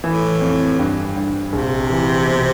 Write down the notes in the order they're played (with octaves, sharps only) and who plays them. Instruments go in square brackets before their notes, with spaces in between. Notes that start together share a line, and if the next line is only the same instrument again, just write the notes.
[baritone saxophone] A2 [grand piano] E3
[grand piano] F2
G2
G2
[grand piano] A#1 [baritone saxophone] C3
[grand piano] E3
B2